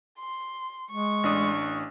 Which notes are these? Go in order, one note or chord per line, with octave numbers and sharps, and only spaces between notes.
C6
G#3 C#6
A1 D4 D#6